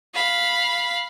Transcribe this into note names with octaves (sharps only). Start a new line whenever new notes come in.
F5 B5